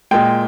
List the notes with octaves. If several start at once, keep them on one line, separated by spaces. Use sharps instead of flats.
A#2 G#3 G5